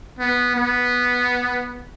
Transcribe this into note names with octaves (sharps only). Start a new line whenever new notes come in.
B3
B3